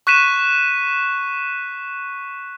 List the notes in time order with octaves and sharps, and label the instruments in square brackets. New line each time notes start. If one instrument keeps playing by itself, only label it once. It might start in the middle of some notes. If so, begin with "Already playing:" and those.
[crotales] C#6 F#6 B6 D#7 E7